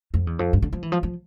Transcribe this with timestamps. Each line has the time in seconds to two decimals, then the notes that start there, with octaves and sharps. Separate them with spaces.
0.14 F2
0.27 E2
0.39 F2
0.53 G2
0.62 D3
0.73 F3
0.83 E3
0.92 F3
1.03 F3